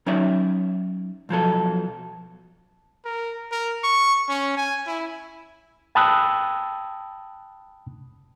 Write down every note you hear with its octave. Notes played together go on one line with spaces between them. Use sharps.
F#3 C#4 D#4 D5 E5
B1 F3 F#3 A4
A#4
A#4
C#6
C#4
G#5
E4
G5 A5 B5 D#6 E6 F#6